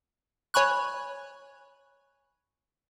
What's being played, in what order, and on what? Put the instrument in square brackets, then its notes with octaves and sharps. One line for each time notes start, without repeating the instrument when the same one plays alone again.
[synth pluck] C#5 G#5 B5 C#6 F#6